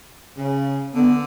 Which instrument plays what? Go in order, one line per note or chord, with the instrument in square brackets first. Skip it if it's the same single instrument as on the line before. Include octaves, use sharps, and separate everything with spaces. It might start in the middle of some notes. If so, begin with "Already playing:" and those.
[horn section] C#3
[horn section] D3 [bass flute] B3